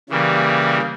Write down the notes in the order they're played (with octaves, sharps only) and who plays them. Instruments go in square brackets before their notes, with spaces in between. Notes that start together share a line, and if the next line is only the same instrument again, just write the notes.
[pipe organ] C#3 E3 G3 A#3